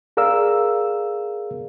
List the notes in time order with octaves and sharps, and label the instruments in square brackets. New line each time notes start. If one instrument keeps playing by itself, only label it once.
[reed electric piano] G#4 A#4 D5 F5 E6